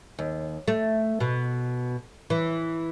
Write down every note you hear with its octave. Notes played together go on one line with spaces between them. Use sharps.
D#2
A3
B2
E3